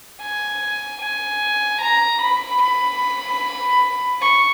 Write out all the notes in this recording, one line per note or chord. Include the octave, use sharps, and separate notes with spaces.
G#5
G#5
A#5
B5
B5
C#6